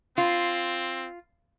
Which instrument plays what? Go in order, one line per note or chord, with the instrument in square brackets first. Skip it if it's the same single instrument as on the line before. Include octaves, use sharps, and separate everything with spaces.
[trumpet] C4 [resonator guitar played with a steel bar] F4